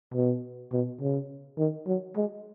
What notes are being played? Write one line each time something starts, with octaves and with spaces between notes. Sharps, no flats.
B2
B2
C#3
D#3
F#3
G#3